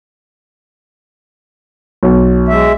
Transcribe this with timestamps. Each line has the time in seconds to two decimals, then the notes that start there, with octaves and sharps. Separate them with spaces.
2.03 B1
2.48 G#3 E5